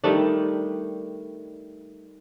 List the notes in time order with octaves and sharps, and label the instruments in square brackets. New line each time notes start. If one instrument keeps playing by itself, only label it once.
[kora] D#3 G3 A3 D4